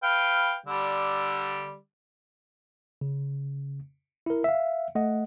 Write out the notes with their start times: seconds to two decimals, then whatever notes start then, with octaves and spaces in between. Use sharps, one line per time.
0.03 B4 F5 G5
0.66 D3 G3
3.01 C#3
4.26 E4 A#4
4.44 E5 F5
4.95 A3 D#5 F#5